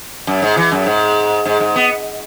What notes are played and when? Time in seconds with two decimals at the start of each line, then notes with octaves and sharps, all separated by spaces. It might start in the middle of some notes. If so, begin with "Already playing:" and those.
0.27 F#2
0.42 G#2
0.57 E3
0.72 F#2
0.86 G#2
1.45 G#2
1.60 G#2
1.75 B3